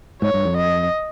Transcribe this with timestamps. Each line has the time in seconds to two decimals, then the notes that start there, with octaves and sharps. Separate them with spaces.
0.21 G#2 C#5
0.34 G2
0.45 F2
0.57 D#5